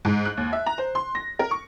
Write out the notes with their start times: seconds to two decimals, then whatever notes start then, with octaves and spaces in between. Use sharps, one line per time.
0.05 G#2
0.25 F#6
0.37 D#2
0.53 E5
0.66 A#5
0.78 C5
0.95 C6
1.15 A#6
1.39 A#4
1.51 C#6